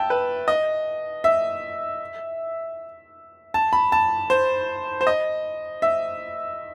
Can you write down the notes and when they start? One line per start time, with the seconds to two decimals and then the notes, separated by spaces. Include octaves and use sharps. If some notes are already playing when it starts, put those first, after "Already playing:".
Already playing: E5 G5 A5
0.10 B4
0.48 D#5
1.24 E5
3.54 A5
3.73 B5
3.92 A5
4.30 C5
5.01 C5
5.07 D#5
5.82 E5